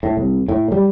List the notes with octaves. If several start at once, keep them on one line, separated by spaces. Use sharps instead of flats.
A2
C2
A2
G3